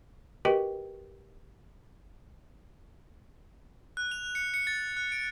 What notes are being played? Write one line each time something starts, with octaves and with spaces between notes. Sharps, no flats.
F#4 G4 A#4 B4 D#5 G5
F#6
F7
C#7
C#7
A6
F#6
D7